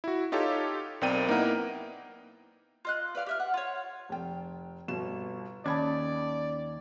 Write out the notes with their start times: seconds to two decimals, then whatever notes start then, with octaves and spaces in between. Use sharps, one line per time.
0.04 E4 F#4
0.32 D#4 F4 G4 A4 C#5
1.01 B1 C4 A#4 D5 G5 D#7
1.29 A#3 B3 D#4 E4 A#4 F#5
2.85 F4 D#5 F#6
3.15 B4 D5 F5 F6
3.26 G4 E5 F6
3.40 F#5
3.54 F4 C#5
4.09 F1 G5
4.88 G1 B2 E7
5.66 D#2 C#4 D5 A5 B5 G#6